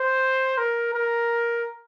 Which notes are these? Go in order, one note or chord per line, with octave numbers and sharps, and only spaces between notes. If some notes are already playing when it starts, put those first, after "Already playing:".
Already playing: C5
A#4
A#4